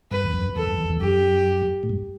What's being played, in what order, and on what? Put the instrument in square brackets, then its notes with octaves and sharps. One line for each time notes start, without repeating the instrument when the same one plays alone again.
[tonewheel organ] G2 [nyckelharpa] B4
[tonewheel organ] E2
F#2
[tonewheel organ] E2 [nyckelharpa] A4
[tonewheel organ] F#2
E2
E2
[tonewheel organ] F#2 [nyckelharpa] G4
[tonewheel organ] A2
G2